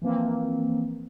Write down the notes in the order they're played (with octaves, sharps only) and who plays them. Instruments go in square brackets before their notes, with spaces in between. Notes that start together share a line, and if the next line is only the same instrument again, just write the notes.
[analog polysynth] E3 F3 A#3 C4